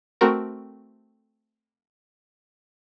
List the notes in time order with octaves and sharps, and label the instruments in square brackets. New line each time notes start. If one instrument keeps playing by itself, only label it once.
[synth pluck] A3 C4 F#4 A#4